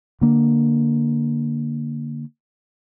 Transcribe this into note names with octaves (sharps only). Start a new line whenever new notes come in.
D3 A#3